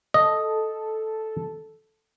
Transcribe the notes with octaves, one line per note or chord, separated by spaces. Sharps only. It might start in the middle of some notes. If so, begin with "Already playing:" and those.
A4 D#5